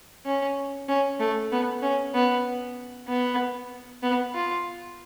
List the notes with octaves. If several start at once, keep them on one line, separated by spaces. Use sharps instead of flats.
C#4
C#4
A3
B3
C#4
B3
B3
B3
F4